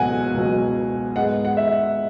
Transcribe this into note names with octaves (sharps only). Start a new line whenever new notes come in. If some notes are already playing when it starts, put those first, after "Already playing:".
Already playing: C#2 B2 F#3 F#5 G#5
C#2 B2 F#3
G#2 G#3 B3 F#5
F#5
E5